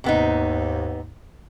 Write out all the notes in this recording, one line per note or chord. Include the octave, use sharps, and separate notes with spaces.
D#2 G#2 C3 B3 D#4